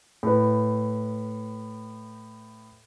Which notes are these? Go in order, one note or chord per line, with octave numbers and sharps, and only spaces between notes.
A2 B4